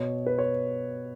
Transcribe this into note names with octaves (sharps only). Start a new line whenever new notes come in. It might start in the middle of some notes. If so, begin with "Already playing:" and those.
Already playing: B2 C#5
B4
C#5